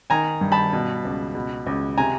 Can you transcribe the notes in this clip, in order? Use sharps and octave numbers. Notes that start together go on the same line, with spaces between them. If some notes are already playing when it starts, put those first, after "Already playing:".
D#3 G#5 A#5
G2
A5 B5
B2
C#2
B2
C#2
C3 G#5 A#5